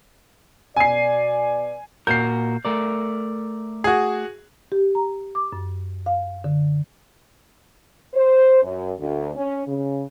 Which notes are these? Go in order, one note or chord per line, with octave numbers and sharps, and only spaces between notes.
B2 D5 G#5 C7
A#2 F#4 A#4 G6 C7
A3 A#4 D5
F#4 G#4
G4
A#5
D6
F#2
F5
D3
C5
F#2
D2
C#4
C#3